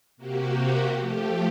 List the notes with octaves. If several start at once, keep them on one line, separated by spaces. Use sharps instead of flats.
C3 A#3 F#4 G4
F3 A3 G4